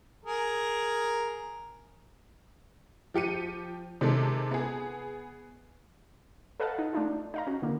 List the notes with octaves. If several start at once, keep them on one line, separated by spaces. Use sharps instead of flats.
G#4 A#4
F3 G4 C#7 D#7
C3 D#3 G#3 A4
B3 G#4
A4 B4 D#5 F5 F#5 A5
D#4
A3 D4 D#4 F4
D#4 F5 A#5
C#4 F#4
D3 E3 A#3